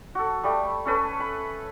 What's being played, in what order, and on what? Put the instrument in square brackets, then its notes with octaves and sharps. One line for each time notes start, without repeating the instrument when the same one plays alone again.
[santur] F#4 A4
G3 A3
C#4 A4 B4
B5